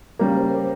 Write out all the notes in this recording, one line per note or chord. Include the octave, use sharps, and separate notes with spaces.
C#3 G3 A#3 C#5
C5
A#4